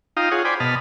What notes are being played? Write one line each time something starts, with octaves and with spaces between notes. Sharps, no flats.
D#4 F4 F5 G5 A#5 D#6
F4 G#4 C#5 F#5
C5 D5 G5 G#5 B5
B2 D#5 A5 B5 F6